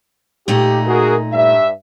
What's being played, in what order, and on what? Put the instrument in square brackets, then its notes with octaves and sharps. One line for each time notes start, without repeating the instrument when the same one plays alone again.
[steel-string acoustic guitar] A#2 A3 D#4 [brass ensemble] G4
[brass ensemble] F#4 G#4 A#4
G2 E5